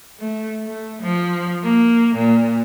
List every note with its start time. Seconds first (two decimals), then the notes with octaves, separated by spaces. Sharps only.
0.20 A3
0.66 A3
1.02 F3
1.64 A#3
2.16 A#2